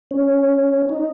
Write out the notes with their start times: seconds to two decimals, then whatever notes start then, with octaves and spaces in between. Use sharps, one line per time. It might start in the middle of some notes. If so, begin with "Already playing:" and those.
0.11 C#4
0.89 D#4